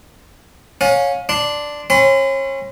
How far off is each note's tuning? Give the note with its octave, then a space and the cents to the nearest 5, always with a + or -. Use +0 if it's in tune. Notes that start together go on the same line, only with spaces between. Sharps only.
C#4 +0 F5 +30
D4 +0 C6 -5
C#4 -35 C6 -45